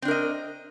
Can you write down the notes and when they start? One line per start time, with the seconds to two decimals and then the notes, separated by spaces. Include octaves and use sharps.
0.02 C4
0.05 D4
0.08 A#4
0.11 D#5